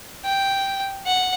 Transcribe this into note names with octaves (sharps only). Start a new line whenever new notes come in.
G5
F#5